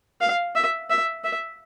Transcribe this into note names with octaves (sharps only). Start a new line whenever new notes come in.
F5
E5
E5
E5